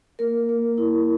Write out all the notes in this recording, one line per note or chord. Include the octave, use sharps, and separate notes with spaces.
A#3 A#4
A#3
E4